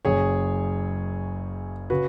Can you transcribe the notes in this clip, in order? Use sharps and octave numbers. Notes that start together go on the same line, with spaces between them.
F#1 F#2 C#3 G#4 C#5
C#3 F#4 B4